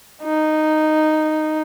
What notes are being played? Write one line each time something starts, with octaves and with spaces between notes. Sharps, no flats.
D#4